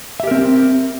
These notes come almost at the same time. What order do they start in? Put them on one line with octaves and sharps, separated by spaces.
E5 G4 A#4 C4